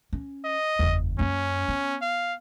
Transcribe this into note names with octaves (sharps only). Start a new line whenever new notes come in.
C#4
D#5
F#1 E2
F#2 A#3 C#4
B3
F5